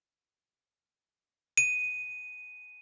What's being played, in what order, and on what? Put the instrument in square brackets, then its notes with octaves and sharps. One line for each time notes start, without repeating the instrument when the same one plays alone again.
[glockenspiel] D#7